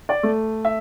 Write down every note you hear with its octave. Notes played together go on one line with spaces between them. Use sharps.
D5
A3
E5